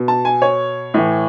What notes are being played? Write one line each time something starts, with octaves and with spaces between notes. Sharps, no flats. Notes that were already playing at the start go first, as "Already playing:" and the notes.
Already playing: B2
A5
G#5
C#5
A2 E3